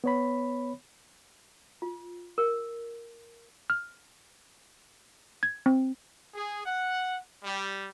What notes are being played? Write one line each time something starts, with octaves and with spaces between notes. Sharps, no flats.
B3 C#5 B5
F4
A#4
F6
G#6
C4
G#4
F#5
G3